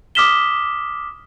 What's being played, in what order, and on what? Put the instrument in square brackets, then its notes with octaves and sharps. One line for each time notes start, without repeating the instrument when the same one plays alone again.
[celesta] D6 D#6 F6 B6 E7 G7